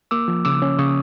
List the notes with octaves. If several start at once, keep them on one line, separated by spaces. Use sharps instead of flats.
A#3 D6 E6
F3
C#3 D6 E6
C#4
C#3 C#6 D#6